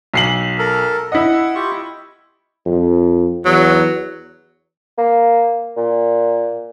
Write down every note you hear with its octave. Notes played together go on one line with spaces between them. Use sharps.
B1 C7 F#7
A4 A#4
E4 D#5 F#5
F4 G4 C#6
F2
E2 F#3
A#3
A#2